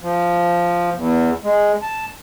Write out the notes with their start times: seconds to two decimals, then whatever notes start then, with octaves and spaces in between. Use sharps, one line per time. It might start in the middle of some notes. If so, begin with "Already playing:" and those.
0.01 F3
0.96 E2
1.44 G#3
1.82 A5